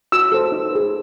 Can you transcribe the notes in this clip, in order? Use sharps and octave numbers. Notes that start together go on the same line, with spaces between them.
F#4 E6
A4 C5
D#4
G#4 B4